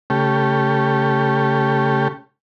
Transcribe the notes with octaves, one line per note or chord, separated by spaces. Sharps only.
C#3 A3 G4